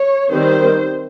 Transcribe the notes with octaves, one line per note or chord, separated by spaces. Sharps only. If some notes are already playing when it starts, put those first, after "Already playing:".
Already playing: C#5
D#3 G3 C4 C5